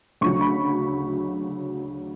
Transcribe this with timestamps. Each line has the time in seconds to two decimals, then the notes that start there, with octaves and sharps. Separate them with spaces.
0.21 D2 C#3 F#3 C#6
0.41 B5